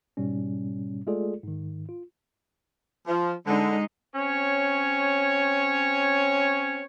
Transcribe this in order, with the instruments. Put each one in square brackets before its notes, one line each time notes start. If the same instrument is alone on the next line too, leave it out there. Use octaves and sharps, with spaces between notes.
[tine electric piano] G#2 B2 G3 C#4
G#3 A3 F4 G#4 A4 D5
G#2 D#3
F4
[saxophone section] F3
[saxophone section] D3 [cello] G#3 D#4
[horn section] C4 C#4 C#5